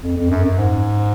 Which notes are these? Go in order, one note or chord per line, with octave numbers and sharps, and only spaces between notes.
F2
F2
F#2
F#2
G#2